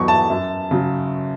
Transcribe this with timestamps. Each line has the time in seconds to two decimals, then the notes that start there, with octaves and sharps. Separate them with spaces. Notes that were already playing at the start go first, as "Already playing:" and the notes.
Already playing: E2 B2 F#3 B5 C#6
0.08 A5
0.30 F#2
0.71 C#3 F#3